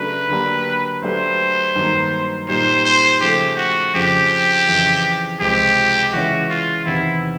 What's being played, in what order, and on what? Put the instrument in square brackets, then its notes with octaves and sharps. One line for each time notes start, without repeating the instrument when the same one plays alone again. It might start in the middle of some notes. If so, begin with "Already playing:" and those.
Already playing: [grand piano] C#3 F#3 A3 D4 F#4 [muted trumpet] B4
[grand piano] D3 F#3 A#3 D4 G4
[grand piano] F#3 A3 D4 G4 B4 [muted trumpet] C5
[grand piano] G2 D#3 F#3 A#3
[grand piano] A#2 G3 A#3 D#4 [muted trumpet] C5
[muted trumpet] C5
[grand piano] C#3 F3 A3 [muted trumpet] G4
[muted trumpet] F#4
[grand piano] F2 C#3 F3 [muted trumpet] G4
[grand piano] F2 C#3 E3
[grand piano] C#2 C3 F3 G#3 C4 [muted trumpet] G4
[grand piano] C#3 E3 G#3 C#4 E4 [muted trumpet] F#4
[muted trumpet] F4
[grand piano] E2 C3 D#3 [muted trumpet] E4